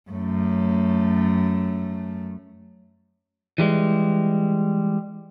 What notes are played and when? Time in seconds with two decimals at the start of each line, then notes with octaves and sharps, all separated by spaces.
0.10 F#2 A3
3.58 E3 G3 G#3